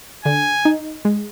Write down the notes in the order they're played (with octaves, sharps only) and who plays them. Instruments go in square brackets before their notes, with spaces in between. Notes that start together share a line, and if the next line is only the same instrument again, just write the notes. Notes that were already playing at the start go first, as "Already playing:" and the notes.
[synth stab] D3 [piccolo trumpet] G#5
[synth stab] D#4
G#3